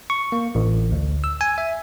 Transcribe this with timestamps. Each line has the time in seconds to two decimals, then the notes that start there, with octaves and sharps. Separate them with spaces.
0.10 C#6
0.32 A#3
0.55 A1
0.92 D2
1.24 E6
1.41 G#5
1.58 E5